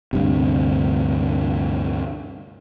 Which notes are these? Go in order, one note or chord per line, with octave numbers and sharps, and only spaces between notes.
D2 G2 C3